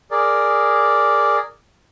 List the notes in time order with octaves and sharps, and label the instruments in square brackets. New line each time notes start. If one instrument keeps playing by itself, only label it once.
[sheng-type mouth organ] G#4 A#4 D5